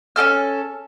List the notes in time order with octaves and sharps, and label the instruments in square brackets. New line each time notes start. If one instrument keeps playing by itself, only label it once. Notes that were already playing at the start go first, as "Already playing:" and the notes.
[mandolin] C#4 G4 A4 F6